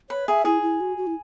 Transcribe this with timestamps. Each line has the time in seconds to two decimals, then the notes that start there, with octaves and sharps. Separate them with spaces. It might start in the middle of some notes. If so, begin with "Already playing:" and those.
0.10 B4 C#5
0.28 G#4 E5
0.45 E4 G#4
0.62 E4
0.80 F#4
0.97 F#4
1.07 E4